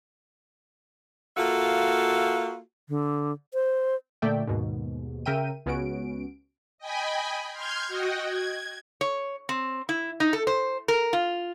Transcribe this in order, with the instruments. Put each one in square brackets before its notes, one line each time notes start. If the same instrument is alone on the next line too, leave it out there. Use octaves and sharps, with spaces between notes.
[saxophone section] A#3 F4 F#4 A4 E5
[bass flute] D3
C5
[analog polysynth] A#2 D3 A3 D5 E5 G5
D#2 G#2 B2
C#3 A#4 E5 G5 D#7
C#2 B3 C#4 F#4 D7
[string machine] D#5 G5 G#5 B5
C6 F6 G6 G#6
F#4 D#5 F#5 G5
G#6
[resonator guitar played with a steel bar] C#5
C4
E4
D#4
A4
C5
A#4
F4